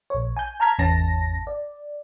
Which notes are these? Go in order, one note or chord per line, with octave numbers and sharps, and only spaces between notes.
A#1 C#5
G#5 G6
A5 A#5 F6 G#6 B6
G#1 E2 C#4 A5 A#6
D5